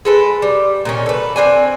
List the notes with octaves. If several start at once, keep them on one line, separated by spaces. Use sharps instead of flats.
G#3 A4 B4
G3
A#2 D#3 C#4
A4 B4
C4 D4 G#5